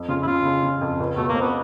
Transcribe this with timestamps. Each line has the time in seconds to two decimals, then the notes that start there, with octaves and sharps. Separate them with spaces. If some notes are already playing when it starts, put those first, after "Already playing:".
Already playing: F2
0.08 C#3 F4
0.22 E4
0.27 C#3 F4
0.45 C#3
0.62 C#3
0.81 F2
1.00 C#2
1.17 B2 A3
1.29 A#3
1.35 C4
1.41 B3